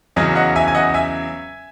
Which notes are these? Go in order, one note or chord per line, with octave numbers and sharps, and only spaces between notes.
E2 C#3 F#3 C#4 D#5
D#5 F#5
E5 G#5
G#5
D#5 F#5
E5 G#5